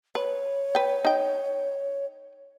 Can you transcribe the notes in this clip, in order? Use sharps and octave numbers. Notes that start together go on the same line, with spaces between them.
B4 C#5
B4 G5
D#4 G5